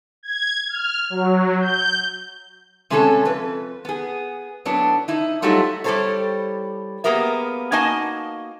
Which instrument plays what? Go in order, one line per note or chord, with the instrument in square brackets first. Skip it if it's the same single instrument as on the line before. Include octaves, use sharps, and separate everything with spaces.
[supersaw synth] G#6
F6
F#3
G6
[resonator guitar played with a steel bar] C3 G#3 A3 C#4 D4 A4
F2 B4
B3 G#4
A2 F#3 B3 D4
D#4 E4
F#3 G3 A3 D#4 F4 F#4
G3 E4 G4 A4 C5 C#5
A#3 B3 G4 G#4 A#4 E5
A#3 D#4 F#4 D#5 G#5 A5